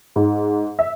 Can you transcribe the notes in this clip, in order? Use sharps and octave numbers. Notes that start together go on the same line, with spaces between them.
G#2
E5